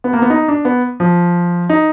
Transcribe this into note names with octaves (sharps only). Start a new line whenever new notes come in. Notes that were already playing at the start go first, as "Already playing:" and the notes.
B3
A#3
B3
D#4
D4
B3
F3
D#4